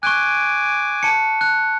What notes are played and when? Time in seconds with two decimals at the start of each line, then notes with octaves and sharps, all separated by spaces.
0.03 G#5 C#6 D6 F#6
1.03 A5 C#7
1.41 F#6